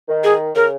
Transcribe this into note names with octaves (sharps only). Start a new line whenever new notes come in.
D#3
G#4
C#3 A#4